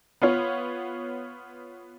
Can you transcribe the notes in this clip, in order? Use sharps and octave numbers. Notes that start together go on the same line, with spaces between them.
B3 F4 C#5